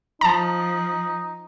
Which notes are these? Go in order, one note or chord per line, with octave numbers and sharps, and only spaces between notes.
F3 D#4 A5 A#5